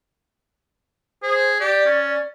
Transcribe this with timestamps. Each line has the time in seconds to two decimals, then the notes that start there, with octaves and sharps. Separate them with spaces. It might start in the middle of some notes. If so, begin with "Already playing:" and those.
1.23 G#4 C5
1.60 G4 D5
1.86 C#4